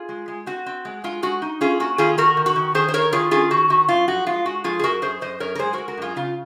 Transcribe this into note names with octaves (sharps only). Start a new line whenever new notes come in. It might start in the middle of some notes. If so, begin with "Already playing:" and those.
Already playing: F4 G#4
G#3
G#3
C4 F#4
C4
G#3
G#3 F4
G#3 F#4
D#4
C#4 F4 G#4
A#3 F#4
D#3 F4 G#4
D#3 F#4 A#4
D#3
F#4
D#3
D#3 G#4 C5
C5
D#3 A#4 C#5
D#3 F4 G#4
C#4 F4 G#4
D#3 F#4
D#3 F#4
F#2 F4
F3 F#4
G#3 F4
G#3 F#4
F3 F4 G#4
G#4
F#2 F#4 A#4
F#2 G#4 C5
F#2 C5 D#5
F#2 A#4 C#5
A#4
G#3 G#4 C5
G#3 F#4 A#4
F#4 A#4
F#2 F4 G#4
C#3 F4